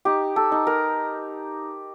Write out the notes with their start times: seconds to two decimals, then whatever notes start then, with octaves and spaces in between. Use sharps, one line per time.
0.05 D#4 G4
0.36 A4
0.52 D#4
0.67 A#4